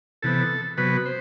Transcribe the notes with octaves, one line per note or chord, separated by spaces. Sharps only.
C3 E3 B3 A4
C3 F#3 B3 B4
C5